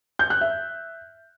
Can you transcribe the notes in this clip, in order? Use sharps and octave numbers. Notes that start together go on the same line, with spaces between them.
G6
F#6
E5